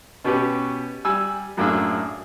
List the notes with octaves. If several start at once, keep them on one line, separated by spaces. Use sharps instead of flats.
B2 C#4 G4 B4
G3 G#5 E6
F#2 A2 A#3 D4 G#4 E5